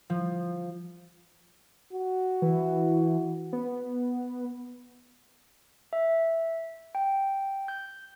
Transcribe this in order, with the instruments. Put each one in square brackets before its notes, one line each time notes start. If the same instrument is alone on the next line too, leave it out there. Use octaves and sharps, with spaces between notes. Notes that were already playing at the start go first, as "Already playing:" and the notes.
[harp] F3
[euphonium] F#4
[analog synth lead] E3
B3
[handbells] E5
G5
G6